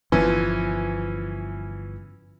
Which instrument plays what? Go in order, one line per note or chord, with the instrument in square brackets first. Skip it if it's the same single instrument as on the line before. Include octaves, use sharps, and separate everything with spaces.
[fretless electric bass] G1 F3 [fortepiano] E3 B3 C#4